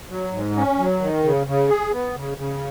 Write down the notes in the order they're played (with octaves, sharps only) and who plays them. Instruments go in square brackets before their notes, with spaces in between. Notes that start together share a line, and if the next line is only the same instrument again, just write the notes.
[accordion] F#3
G#2
C#4
F#3
D#3
C#3
C#3
G#4
B3
C#3
C#3